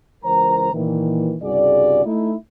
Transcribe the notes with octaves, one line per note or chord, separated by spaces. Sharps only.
C#2 E3 A#4 C5 A#5
A#2 D#3 E3
C2 G2 C#3 F#4 G#4 D5
A3 D#4 E4